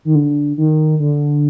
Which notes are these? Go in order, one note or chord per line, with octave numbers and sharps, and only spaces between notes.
D#3
D3
D#3
D3